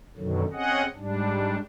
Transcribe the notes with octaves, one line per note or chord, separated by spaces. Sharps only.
F#2 B2 D3 D#3 F#3
C4 C#4 G#4 D#5 F#5
G#2 G3 D4